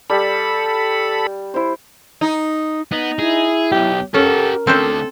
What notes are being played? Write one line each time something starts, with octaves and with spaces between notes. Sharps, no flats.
G3 A4 B5
E4 C5
D#4
B3 D#4
E4 G#4
B1 G4
C#4 G4 A4 A#4 F#5
D3 A3 C4 C#4 A4 C5